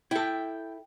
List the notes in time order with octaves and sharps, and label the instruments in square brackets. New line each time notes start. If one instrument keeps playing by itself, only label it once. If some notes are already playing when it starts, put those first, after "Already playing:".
[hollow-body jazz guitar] E4 A4 [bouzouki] G5